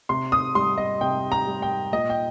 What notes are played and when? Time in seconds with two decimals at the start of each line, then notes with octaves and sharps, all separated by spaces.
0.09 C3 C6
0.32 D#6
0.55 G3 C6
0.78 D#5
1.01 C3 G5
1.32 A#5
1.47 G3
1.62 G5
1.92 A#2 D#5
2.10 G5